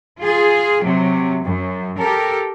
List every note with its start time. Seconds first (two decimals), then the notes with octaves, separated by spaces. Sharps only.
0.20 F4 G#4
0.83 C3 F#3
1.44 F#2
1.97 G4 A4 A#4